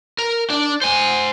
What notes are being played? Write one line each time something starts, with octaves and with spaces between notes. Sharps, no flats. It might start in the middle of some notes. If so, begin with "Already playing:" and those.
A#4
D4 D5
C5 G#5